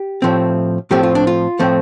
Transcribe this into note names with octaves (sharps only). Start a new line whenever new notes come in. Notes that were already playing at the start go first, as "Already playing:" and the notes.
Already playing: G4
A2 F3 A3 C4
A2 F3 A3 C4 G4
F4
D4
F4
A2 F3 A3 C4